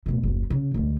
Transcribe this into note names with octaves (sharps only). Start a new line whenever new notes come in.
D1 B2
F#1 D#2
C#3
D2 G#3